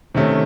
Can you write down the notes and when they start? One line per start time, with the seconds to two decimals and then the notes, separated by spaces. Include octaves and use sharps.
0.15 C3 D#3 A3 C#4